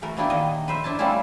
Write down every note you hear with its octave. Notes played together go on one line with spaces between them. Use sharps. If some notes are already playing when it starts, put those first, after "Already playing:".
E3 A3 F#4 A#4
A#3 B3 D4 E4 G4
A#2 D#3 D#5
B4 C5 E5
D4 E4 A5
G3 A3 A#3 C4 C#4 E4